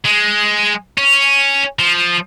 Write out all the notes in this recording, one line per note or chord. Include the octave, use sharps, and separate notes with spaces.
G#3
C#4
F3